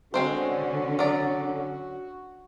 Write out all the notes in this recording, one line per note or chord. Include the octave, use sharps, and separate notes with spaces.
D3 G#3 C4 C#4 F#4 C5
F#3 D5